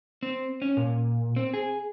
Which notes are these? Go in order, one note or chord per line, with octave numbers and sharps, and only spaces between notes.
C4
C#4
A#2
C4
G#4